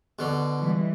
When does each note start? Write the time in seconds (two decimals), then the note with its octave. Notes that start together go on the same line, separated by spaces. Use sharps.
0.19 B2 D3
0.62 E3 G3 G#3